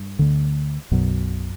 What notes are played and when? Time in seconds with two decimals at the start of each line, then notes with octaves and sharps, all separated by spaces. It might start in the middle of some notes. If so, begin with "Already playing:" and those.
Already playing: G2
0.19 D2 D3
0.91 B1 F#2 B2 F#3